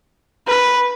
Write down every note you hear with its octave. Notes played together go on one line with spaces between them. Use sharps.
B4